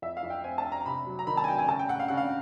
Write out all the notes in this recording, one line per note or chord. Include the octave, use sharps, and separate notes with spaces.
F2 E5
F5
F2
G5
C4 G#5
A5
C4
A#5
C3 B5
F#3
A#5
D#3 B5
A5
G#5
F#3 G5
G#5
C#3 A5
G5
C#3 F#5
F5
C#3 F#5
F5